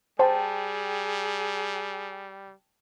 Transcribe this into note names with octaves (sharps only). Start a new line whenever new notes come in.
G3 G#4 C5 G5 A5